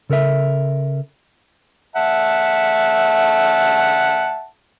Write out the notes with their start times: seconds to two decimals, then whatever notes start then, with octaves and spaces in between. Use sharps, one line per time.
0.10 C#3 A4 A#4 E5
1.96 E5 F#5 A5